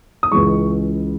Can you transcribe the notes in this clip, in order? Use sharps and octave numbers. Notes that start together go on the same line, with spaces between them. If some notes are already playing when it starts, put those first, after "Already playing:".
D#6
C#2 C#3 E3 G#3 C#6